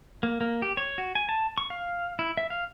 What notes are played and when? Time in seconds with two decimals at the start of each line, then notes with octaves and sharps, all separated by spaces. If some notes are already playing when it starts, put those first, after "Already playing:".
0.23 A#3
0.41 A#3
0.62 G4
0.77 C#5
0.98 F#4
1.15 G#5
1.29 A5
1.58 C#6
1.70 F5
2.19 E4
2.37 E5
2.50 F5